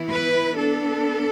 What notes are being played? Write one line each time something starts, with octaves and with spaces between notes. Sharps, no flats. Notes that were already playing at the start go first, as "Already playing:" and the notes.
Already playing: E3 B3 E4
B4
B3 D4 A4